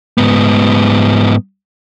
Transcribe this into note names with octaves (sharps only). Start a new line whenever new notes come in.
G#2 B3